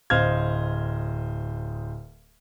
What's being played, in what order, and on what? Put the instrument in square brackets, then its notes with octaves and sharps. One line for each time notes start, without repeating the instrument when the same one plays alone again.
[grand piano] D1 C5 D#5 F5 F6 G#6